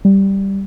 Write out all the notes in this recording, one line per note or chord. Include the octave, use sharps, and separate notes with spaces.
G3